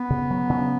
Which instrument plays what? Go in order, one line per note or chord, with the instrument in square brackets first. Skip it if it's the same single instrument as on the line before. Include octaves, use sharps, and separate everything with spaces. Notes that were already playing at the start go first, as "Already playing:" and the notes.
Already playing: [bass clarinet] B3
[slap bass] C#3
F#3
C#3